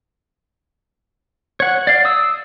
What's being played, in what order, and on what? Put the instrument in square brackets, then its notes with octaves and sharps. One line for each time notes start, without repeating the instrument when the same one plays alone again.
[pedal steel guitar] C#5 F#5
D5 F5
D#6 E6